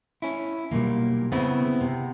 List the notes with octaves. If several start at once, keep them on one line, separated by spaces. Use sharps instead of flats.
C#4 E4
B1 A#2 G3 A#3
C#3 B3 C4 E4
C3